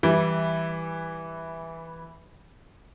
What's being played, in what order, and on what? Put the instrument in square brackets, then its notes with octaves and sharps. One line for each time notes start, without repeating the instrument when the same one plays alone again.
[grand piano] E3 G3